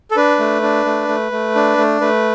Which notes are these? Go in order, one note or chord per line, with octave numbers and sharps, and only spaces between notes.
A4
D4 B4
A3
D4
A3
A3
A3
D4
A3
A3 B4